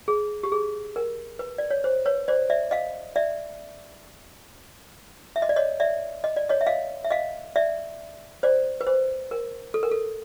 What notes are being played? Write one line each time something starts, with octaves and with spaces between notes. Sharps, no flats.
G#4
G4
G#4
A#4
B4
D5
C#5
C5
B4 C#5
C5 D5
D5 E5
D#5 F5
D5 E5
E5
D#5
D5
C#5 D#5
D5 E5
D#5
D5
C#5 D#5
E5
D#5 F5
E5
D#5 F5
D5 E5
C5 D5
B4
C5
A#4
A4
A#4
A4